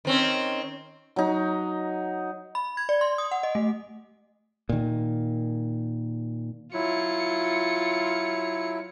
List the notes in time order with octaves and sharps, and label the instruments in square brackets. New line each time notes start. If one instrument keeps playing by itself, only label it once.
[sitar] D#3 C4 C#4
[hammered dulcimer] F#3 D#4
[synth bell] B5
G#6
D5
C6
D#6
F#5
D#5
A3
[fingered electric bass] A#2 D#3
[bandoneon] F#3 E4 [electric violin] F4 C#7